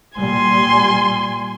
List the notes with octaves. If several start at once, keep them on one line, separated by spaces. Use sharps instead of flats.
A#2 G3 G#5 C6